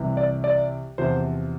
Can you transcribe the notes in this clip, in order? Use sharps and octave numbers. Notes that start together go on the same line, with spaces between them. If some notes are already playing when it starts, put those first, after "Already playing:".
Already playing: C2 C3 E3
D5
D5
E2 C3 F3 C5